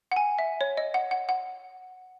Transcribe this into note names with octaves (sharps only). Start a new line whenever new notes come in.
F#5
G#5
E5
C#5
D#5
F#5
F#5
F#5